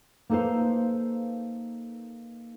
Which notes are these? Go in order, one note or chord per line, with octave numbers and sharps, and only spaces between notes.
A#3 D#4 A4 B4 C5 F5